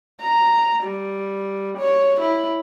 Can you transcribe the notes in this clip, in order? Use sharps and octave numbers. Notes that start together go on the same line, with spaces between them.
A#5
G3
C#5
E4